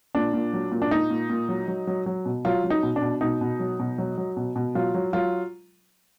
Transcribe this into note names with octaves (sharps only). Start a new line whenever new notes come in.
A#2 D4
A#2
F#3
A#2
D4
A#2 D#4
A#2
A#2
F#3
F#3
F#3
F#3
B2
F#3 F4
F#3
D#4
B2
D4
B2
B2 D#4
B2
F#3
B2
F#3
F#3
B2
B2
F#3 F4
F#3
F#3 F4